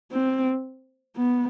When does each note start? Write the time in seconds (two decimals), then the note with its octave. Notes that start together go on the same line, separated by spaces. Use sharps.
0.12 C4
1.17 B3